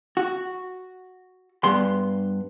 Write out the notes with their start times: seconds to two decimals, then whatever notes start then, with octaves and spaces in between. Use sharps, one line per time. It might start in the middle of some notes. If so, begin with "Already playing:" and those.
0.17 F#4
1.64 G2 B3 C6